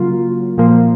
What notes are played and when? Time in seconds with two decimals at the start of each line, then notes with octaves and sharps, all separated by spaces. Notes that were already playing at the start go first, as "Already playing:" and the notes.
Already playing: C#3 F#3 A#3 F4
0.58 A#2 F3 A#3